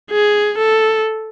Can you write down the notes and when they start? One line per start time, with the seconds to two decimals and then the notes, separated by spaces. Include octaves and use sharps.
0.11 G#4
0.58 A4